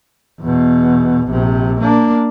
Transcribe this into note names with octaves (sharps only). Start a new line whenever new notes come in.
E2 B2
A#1 C3
A#3 D4